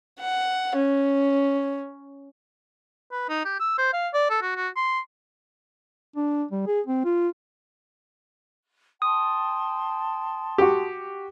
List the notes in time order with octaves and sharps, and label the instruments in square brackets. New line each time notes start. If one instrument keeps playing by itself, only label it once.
[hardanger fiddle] F#5
C#4
[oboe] B4
D#4
G4
E6
C5
F5
D5
A4
F#4
F#4
C6
[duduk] D4
G3
G#4
C4
F4
[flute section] G5 A5 C6 [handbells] D#6
[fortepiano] F#4 G4